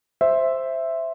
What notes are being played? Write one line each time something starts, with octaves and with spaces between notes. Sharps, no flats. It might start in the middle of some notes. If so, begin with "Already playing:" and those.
C5 E5